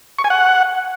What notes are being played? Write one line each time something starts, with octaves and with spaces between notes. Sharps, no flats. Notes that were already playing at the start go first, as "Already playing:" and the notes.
C#6
G#5
F#5